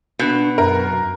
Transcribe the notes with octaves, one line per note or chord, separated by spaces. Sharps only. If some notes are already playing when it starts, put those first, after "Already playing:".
B2 D4
F#2 A#4